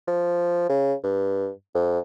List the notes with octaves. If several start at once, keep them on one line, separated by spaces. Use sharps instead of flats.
F3
C#3
G2
F2